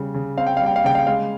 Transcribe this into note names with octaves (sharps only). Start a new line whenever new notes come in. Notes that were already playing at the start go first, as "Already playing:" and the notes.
Already playing: C#3 G3
C#3
C4 F5
G5
G3 F5
G5
F5
C#3 G5
F5
G#3 F5